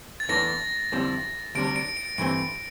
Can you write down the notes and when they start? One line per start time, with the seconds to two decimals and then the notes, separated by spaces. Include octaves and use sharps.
0.20 A6
0.29 E2 E3 A3 D4 A#6
0.92 F2 D3 G3 C4 E4
1.55 D2 C3 G3 D4 D7
1.76 D7
1.97 D7
2.18 G2 E3 A3 C4 D7